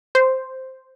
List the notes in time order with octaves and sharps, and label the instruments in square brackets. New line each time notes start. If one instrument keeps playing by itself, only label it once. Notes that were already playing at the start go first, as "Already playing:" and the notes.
[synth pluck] C5